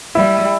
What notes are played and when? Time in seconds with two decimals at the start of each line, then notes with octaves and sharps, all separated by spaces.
0.15 G3 E4